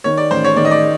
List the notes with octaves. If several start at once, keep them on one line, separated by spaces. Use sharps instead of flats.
D#3 C#5
D5
A1 C5
C#5
D#3 D5
D#5
D5